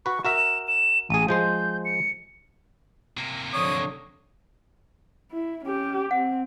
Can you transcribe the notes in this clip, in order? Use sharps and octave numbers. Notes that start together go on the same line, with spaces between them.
F#4 B4 C#6
F#4 A#4 E5 E7
E7
A1 G#4 D#7
F3 G#3 C5 G6
C#7
C3 A#3
D3 F3 F#3 C#5 D#6
E4
C#4 G4
C4 F#5